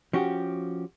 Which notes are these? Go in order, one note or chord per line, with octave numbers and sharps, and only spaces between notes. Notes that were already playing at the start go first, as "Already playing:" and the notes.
F3 C#4 F#4 G4